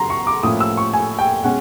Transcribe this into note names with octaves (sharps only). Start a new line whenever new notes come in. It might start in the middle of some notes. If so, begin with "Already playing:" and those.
Already playing: C#3 F#3 A#5 C6
C#6
D6
A2 F3 A#3 C#4 D#6
E6
C#6
G#5
G5
B2 G#3 C#4 F#5